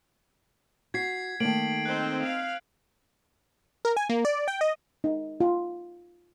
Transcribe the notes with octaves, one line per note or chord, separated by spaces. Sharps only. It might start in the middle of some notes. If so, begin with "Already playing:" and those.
F#4 G#6 B6 C7
D#3 A3 A#3 D7 F#7
C4 D#4 C5 F#6
F5
A#4
G#5
A#3
D5
G5
D#5
D#4
F4